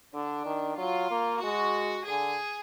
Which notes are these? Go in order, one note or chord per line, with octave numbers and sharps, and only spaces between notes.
D3 D4
D#3
F#3 F4
A#3
G#3 F#4
D3 G#4